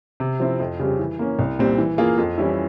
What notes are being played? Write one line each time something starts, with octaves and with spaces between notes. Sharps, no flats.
C3
F3 C4 E4
F2
C#3 G3 C4 G4
E3
A#3 C#4
C2
A#2 G3 C4
E3
A#3 F4 G#4
F2
E3 G3 C#4 E4